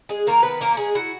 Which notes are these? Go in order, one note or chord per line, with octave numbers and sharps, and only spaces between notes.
G#3 G#4
D#3 A#3 A#4
D#3 B3 B4
A#3 C#4 A#4
G#3 G#4
E4 F#4 F#5